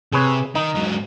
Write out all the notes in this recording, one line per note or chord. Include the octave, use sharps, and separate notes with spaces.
C3 G#4 B4 C#5
D#3 D#4
G#2 F#3